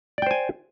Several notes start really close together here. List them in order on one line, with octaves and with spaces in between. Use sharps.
D5 G5 C5 G#5